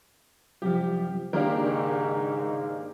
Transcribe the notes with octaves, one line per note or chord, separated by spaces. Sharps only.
C2 F#2 F3 G4
C#2 G#2 D#3 A#3 D4 G4 A#4